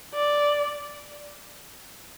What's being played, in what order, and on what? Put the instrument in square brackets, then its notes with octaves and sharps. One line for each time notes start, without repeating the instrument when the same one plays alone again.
[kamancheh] D5